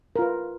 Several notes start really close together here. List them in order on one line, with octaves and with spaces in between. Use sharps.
A#4 F4 B4